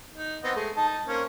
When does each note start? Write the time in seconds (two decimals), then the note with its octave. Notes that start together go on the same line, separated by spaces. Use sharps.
0.14 D#4
0.44 B3 C4 D#5
0.56 G#3 A3
0.77 D#4 A5
1.08 A#3 C4 C#4